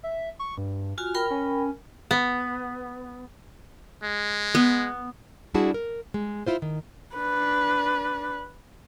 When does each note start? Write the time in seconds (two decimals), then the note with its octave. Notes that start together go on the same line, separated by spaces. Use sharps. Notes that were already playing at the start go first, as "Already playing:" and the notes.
0.03 E5
0.39 C#6
0.58 G2
0.98 F4 F#4 G#5 F6
1.14 A#4 G5 B5
1.30 C#4
2.11 B3
4.03 G#3
4.55 B3
5.54 G3 D4 E4 F#4 G#4 A5
5.74 A#4
6.14 G#3
6.46 E4 F4 C5
6.62 D#3
7.16 D4 B4